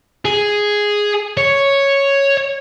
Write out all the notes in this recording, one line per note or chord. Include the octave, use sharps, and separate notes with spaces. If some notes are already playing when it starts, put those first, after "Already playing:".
G#4
C#5